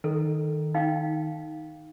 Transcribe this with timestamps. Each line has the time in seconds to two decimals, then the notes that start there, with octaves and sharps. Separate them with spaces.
0.04 D#3 A4
0.74 D#4 F5 G5